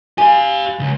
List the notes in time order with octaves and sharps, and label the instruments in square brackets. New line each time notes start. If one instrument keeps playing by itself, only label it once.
[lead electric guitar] G4 F5 [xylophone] G#5
[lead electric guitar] C#2